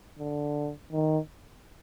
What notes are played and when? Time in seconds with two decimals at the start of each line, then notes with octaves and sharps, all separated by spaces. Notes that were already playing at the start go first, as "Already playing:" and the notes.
0.19 D3
0.92 D#3